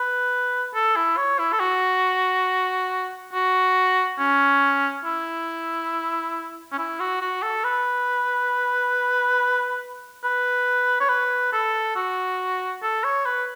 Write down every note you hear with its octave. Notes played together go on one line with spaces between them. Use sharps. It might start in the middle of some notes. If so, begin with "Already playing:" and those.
Already playing: B4
A4
E4
C#5
E4
A4
F#4
F#4
C#4
E4
C#4
E4
F#4
F#4
A4
B4
B4
C#5
B4
A4
F#4
A4
C#5
B4